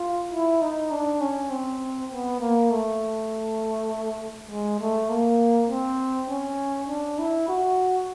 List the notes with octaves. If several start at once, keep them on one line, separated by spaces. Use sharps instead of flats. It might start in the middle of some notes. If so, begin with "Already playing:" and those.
Already playing: F4
E4
D#4
D4
C#4
C4
B3
A#3
A3
G#3
A3
A#3
C4
C#4
D4
E4
F#4